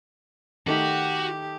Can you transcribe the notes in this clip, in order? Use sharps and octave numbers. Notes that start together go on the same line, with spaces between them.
D#3 A3 D#4 F#4 G4